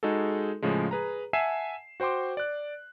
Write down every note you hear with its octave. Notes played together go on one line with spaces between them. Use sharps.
G#3 D#4 F#4 G#4 A4
A2 C#3 F3 G#3
G#4 B4 A#5
E5 F#5 G#5 A5 C7 E7
F#4 C5 G5 C6 D6
D5 F#6